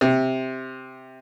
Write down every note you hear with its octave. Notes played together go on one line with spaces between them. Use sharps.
C3